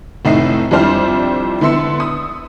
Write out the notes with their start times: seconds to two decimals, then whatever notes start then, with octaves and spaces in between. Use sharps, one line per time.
0.25 F1 A2 D#4 E4 C7
0.71 F2 G3 D4 E4 C5 F6
1.61 D3 B3 E4 C6 E6 C#7
2.00 D#6